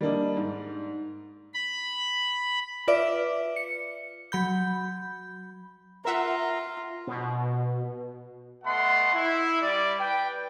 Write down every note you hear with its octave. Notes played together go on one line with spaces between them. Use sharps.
G3 A#3 D4 D#5
G#2
B5
F4 B4 D5 E5 D6
C#7
F#3 B5 G6
F4 A#4 E5 F#5 A#5
B2
A3 B3 D#5 F#5 C6
E4
G3 D5
B4 G5